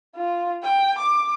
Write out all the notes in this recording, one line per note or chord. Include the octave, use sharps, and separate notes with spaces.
F4
G5
D6